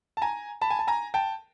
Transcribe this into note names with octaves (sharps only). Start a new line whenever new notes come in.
A5
G#5 A#5
A5 B5
G#5
A5
G#5 A#5
G5 A5